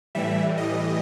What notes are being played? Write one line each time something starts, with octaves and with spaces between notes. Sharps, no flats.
A2 E3 G3 E5
D#5